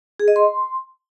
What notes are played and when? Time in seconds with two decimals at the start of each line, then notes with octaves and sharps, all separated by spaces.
0.20 G#4
0.28 D#5
0.36 C6